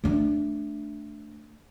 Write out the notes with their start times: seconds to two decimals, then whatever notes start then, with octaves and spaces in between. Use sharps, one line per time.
0.04 A3 D4